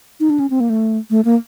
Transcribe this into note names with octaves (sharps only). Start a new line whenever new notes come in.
D#4
D4
C#4
C4
A#3
A3
A3
A#3